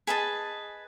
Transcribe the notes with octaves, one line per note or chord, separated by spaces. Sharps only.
G#4 B4 D#5 A5